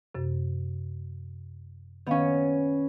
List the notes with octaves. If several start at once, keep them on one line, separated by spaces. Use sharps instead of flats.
F#2 C3
D#3 B3 C#4 F5